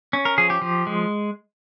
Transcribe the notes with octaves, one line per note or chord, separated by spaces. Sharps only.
C#4
A#4
F3 G#4
G4
F3
G#3